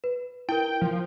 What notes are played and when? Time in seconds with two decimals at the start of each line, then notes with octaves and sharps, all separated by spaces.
0.04 B4
0.49 E4 A#4 G5
0.81 F3